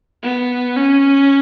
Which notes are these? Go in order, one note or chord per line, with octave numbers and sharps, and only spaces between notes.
B3
C#4